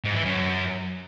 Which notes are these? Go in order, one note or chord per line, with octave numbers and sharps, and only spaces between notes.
G#2
E3
F#2